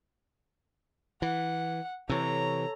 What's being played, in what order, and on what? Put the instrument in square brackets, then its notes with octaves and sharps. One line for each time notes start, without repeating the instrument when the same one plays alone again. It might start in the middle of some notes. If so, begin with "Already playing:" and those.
[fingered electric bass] E3 [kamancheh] F#5
[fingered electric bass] C3 E3 [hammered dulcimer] A4 C#5 [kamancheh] A#5